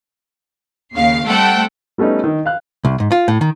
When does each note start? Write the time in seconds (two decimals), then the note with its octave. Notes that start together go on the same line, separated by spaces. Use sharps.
0.93 D#2 C#3 F5 C7
1.26 G3 A3 C4 A4 F#5 G5
1.98 G3 A3 B3 C#4 D#4
2.24 D#3
2.46 F5 F#6
2.85 C2
3.00 G#2
3.12 F4
3.28 A2
3.41 D#3